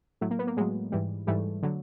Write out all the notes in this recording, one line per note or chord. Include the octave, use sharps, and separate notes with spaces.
A2 F#3 A3
A#3
B3
A#3
A2 F#3 G#3
G#2 E3 G3
G#2 E3 G3 A3
D3 F#3